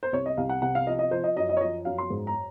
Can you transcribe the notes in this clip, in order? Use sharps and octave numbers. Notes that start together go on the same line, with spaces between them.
C5
C2 C#5
D#5
C2 F5
F#5
C3 F#5
F5
F3 D#5
D#5
F3 C5
D#5
F#2 D#5
D#5
C#5
F3 D#5
F#2 F5
C6
G#2
A#5